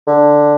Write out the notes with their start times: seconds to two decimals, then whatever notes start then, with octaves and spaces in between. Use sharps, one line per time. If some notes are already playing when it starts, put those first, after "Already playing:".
0.07 D3